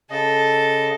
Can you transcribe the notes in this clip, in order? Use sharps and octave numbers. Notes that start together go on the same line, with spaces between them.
C#3 A4 D#5